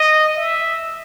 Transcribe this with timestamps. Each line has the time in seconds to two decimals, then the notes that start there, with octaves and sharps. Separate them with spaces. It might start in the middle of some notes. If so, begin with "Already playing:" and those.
Already playing: D#5
0.37 E5